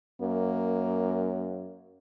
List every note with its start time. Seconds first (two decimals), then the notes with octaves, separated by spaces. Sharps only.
0.21 F#2 A#3